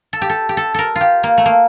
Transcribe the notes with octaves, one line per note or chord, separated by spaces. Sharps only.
A4
G4
A4
G4
A4
A4 A#4
F4
G4
A#3
A3
A#3